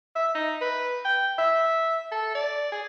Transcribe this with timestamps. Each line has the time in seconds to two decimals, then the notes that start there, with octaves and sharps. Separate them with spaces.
0.16 E5
0.35 D#4
0.62 B4
1.05 G5
1.39 E5
2.12 A4
2.35 D5
2.72 G#4